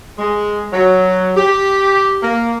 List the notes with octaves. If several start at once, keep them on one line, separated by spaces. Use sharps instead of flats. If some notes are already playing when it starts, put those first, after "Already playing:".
G#3
F#3
G4
A#3